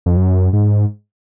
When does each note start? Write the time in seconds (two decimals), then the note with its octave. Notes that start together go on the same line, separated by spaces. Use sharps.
0.06 F2
0.17 F#2
0.53 G#2